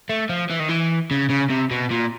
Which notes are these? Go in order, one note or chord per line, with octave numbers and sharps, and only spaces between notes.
A3
F3
E3
D#3
E3
C#3
C#3
C3
B2
A#2